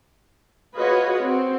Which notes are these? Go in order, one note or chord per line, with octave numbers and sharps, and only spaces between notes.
F4 F#4 G#4 B4 C#5 D#5
C4 F#4